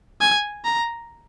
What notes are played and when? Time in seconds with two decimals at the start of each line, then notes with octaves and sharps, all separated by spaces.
0.21 G#5
0.65 A#5